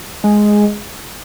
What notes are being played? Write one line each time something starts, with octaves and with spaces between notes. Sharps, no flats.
G#3